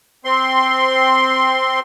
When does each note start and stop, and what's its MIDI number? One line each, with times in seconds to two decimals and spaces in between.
0.25 1.80 60
0.25 1.80 84